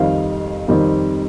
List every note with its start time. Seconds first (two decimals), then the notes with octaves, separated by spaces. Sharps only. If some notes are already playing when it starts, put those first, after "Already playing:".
Already playing: F2 D#3 G3 C4 D#4 F5
0.68 F2 D#3 G3 C4 D#4